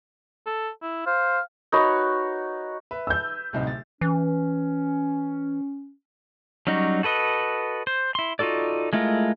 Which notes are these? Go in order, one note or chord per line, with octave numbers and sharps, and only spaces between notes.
A4
E4
C5 F5
D#4 F#4 B4 C#5
B4 E5
E6 G6
D1 C2 D#4
A6
E3 C#4
F#3 G3 C#4 D#4 F#4
F#4 A4 B4 D#5
C5
E4 C6
D#4 F4 F#4 A4 D5
G#3 A3 E4 F4 A#4